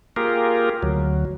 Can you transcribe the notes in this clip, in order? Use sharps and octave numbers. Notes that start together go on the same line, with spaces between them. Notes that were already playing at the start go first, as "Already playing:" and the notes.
A#3 F4 G4 G#4 A#4
D2 F#3